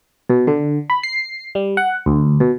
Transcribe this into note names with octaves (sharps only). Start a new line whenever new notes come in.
B2
D3
B5
C7
G3
F#5
D2
B2